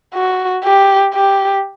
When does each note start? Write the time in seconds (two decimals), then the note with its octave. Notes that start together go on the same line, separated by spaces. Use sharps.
0.14 F#4
0.64 G4
1.15 G4